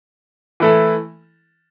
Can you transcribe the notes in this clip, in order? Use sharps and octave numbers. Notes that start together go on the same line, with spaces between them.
E3 A3 E4 A4